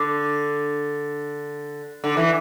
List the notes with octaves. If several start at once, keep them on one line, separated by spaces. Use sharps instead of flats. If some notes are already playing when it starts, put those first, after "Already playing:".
Already playing: D3
D3
E3